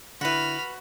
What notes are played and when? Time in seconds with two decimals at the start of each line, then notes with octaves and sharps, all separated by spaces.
0.21 D3 E4 F#4 B4 B5 F6